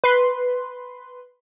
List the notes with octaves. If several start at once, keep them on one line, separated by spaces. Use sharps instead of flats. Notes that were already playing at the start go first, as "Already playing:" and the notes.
B4 C6